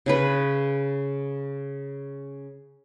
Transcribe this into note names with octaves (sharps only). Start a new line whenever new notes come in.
C#3 G#4 B4